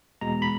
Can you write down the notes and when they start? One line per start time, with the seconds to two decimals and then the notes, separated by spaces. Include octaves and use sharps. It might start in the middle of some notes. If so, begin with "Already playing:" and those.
0.21 E2 B2 G#3 A#5
0.42 B5